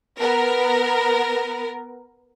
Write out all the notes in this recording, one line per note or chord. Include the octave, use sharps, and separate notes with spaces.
B3 A#4